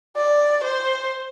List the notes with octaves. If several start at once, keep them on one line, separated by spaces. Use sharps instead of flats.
D5
C5